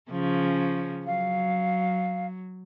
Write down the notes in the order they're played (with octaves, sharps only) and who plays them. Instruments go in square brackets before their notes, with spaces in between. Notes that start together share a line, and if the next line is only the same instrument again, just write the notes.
[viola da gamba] C#3 F3 C#4
[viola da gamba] F#3 [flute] F5